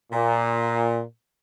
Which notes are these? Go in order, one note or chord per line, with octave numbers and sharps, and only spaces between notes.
A#2